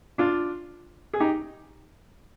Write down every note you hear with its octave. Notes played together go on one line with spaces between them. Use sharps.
D4 F4
G#4
D#4 G4